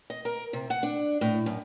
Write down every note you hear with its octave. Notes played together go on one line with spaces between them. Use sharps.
D#5
A#4
C3
F#5
D4
A2
F#2